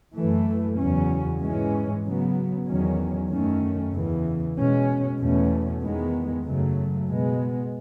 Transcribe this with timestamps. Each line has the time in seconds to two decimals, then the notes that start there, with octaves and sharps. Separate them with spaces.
0.15 F#2 E3 A3
0.78 E2 C#3 F#3 C#4
1.41 G#2 E3 G#3 C#4
2.04 C#3 F#3 B3
2.67 E2 D#3 F#3 C#4
3.30 F#2 D#3 A3 C#4
3.93 E2 C#3 E3
4.56 B2 G#3 C#4
5.18 E2 B2 A3 C#4
5.82 E2 D#3 G#3 B3
6.45 F#2 C#3 F#3 A3
7.08 B2 G#3 B3